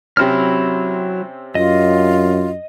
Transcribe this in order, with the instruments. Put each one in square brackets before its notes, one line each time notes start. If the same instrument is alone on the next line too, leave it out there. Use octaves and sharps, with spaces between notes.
[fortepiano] C3 C4 C#4 [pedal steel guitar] F#3 E4 F6
[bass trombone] F#2 [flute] F4 [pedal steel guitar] D#5